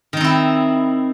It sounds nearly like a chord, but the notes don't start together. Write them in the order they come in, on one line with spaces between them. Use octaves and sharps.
D#3 D#4 C4 E4